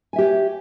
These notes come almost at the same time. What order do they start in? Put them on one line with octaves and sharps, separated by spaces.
G#5 E5 G4 C#5